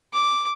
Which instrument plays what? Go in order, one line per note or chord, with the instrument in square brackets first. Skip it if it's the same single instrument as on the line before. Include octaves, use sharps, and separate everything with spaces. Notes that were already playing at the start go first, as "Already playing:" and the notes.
[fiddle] D6